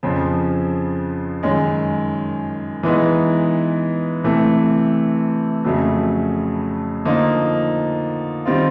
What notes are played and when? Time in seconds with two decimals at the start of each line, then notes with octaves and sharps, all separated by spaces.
0.03 F2 C#3 F3
1.43 F#2 D#3 G#3 C#4
2.83 E3 G#3 B3 D#4
4.24 C3 E3 A3
5.65 F2 C#3 F#3 A3
7.05 D3 F3 A#3 D#4
8.45 D#3 G3 C4 F4